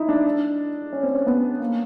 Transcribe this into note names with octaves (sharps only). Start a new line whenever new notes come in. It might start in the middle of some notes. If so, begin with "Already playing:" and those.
Already playing: D#4 E4
D4
C#4
C4
C#4
B3
A#3